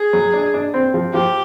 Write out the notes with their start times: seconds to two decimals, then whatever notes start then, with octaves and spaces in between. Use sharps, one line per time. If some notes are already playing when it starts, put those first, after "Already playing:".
Already playing: G#4
0.13 F#3
0.33 D4
0.54 D4
0.74 C4
0.94 F3
1.14 F3 G4